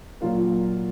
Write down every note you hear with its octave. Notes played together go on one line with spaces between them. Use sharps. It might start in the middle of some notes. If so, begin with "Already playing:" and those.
A#2 F#3 A#3 F4